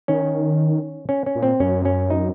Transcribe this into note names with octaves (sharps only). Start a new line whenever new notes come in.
D#3 C#4
C#4
C#4
A#2
C4
F#2 C#4
C#4
D#4